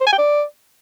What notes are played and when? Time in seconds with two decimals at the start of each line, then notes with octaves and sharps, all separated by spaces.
0.01 C5
0.07 G#5
0.13 G5
0.18 D5